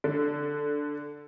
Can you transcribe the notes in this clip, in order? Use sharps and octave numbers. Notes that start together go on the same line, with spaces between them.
D3